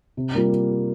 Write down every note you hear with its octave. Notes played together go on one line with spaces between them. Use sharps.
C3
G3 A#3 F4